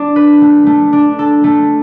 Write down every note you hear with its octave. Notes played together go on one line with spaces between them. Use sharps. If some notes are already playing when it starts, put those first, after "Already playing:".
Already playing: D4
B4
A3
A3
D4
A4
A3